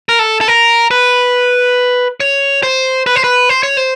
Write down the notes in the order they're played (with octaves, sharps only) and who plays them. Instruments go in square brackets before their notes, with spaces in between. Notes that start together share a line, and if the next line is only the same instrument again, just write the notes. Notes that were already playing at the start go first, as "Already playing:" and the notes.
[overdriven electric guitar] A#4
A4
A4
A#4
B4
C#5
C5
B4
C5
B4
C5
C#5
C5